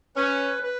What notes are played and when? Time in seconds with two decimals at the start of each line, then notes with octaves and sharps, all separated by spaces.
0.16 C#4 B4
0.63 B4